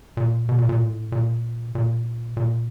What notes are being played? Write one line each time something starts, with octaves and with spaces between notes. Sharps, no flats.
A#2
B2
A#2
A#2
A2
A#2
A#2
A#2